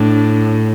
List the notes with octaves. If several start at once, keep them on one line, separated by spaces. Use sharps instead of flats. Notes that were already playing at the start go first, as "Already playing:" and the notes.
Already playing: A2 D4